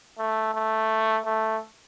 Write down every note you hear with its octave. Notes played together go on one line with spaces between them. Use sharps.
A3
A3
A3